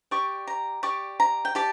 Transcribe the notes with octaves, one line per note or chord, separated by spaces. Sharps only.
G4 D5 C#6
A#5
G4 D5 C#6
A#5
G5
G4 D5 A5